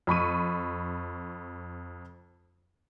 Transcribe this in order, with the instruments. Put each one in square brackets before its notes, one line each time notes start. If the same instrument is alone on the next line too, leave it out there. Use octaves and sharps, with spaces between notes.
[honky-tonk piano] F2 B5 C#6 D#7